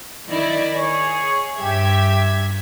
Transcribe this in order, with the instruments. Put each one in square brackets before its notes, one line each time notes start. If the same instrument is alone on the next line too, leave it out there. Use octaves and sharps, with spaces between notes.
[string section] D#3 E4 D5
[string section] G#4 [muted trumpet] C#5
[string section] G2 E5 G#6 [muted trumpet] G4